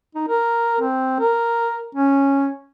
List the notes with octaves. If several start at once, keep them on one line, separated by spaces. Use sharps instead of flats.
D#4
A#4
C4
A#4
C#4